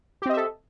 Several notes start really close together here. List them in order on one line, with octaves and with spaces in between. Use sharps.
G4 C4 D#5 E5 A4